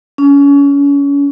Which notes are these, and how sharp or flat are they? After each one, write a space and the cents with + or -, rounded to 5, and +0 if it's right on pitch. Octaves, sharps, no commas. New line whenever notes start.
C#4 +30